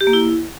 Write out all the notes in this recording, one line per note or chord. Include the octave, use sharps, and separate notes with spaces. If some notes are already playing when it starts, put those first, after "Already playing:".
G4
A#3
E4